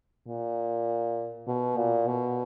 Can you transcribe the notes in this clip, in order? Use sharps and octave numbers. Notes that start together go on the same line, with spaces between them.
A#2
B2
A#2
B2